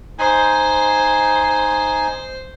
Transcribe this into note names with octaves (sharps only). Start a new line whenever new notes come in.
D#4 C5 G#5